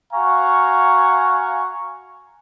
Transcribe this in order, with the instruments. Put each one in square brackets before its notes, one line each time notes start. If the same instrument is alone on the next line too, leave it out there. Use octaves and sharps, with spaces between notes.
[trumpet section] F#4 F5 G#5 A#5 C#6